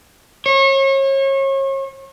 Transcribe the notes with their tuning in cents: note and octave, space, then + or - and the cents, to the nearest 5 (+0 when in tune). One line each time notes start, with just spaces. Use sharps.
C#5 -35